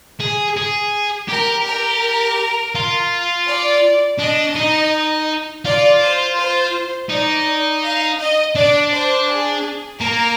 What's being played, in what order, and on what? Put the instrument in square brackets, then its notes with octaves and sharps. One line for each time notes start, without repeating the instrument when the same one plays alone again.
[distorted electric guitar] G#4
G#4
[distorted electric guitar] G4 [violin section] A#4
[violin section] A#4
[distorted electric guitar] F4
[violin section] D5
[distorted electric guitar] D4 [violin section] D#5
[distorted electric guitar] D#4
[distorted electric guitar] F4 [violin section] D5
[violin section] C5
C5
[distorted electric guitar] D#4 [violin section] D5
[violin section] F5
D#5
[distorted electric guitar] D4 [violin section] D5
[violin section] C5
G#4
[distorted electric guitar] A#3 [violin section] A#4